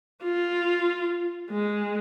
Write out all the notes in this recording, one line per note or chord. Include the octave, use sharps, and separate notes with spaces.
F4
G#3